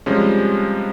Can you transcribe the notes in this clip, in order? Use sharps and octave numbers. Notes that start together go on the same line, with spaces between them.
C3 F3 G3 G#3 C#4